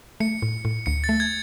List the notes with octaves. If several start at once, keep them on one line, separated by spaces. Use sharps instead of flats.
A3 C#7
A2
A2
D2 C#7
A6
A3
G#6